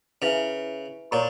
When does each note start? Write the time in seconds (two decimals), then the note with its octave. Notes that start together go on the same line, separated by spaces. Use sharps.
0.22 C#3 E4 B4 E5 G#5
1.11 A#2 A#4 C#5 F#5 A#5 C#6